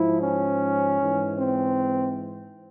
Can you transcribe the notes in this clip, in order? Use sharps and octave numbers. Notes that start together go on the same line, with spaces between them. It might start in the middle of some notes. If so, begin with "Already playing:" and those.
Already playing: G#2 F3 E4
C#4
G#2 E3
C4